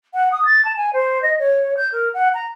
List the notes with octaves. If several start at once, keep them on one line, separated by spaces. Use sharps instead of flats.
F#5
D#6
A6
A5
G#5
C5
D#5
C#5
G6
A#4
F#5
A#5